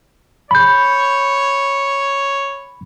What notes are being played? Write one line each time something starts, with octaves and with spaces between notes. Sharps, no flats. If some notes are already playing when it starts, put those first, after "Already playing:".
C#5 B5 G6